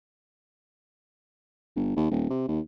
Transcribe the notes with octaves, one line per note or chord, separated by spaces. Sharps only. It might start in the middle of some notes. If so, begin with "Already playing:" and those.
G1
D#2
D#1
C3
D#2